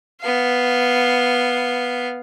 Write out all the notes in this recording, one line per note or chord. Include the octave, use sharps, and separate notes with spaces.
B3 F5